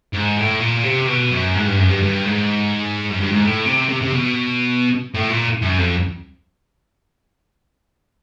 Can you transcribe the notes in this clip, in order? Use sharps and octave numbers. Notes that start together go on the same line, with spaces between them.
G#2
A2
A#2
C3
B2
F#2
G#2
G2
F#2
G2
G2
G#2
F#2
G2
G#2
A2
C3
C3
C3
B2
A2
A#2
F#2
F2